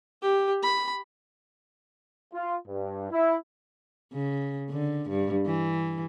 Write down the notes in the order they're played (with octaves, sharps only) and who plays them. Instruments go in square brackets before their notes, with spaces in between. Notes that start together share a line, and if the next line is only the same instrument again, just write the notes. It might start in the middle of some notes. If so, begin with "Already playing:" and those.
[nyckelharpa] G4
B5
[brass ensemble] F4
G2
E4
[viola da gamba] C#3
D3
G2
E3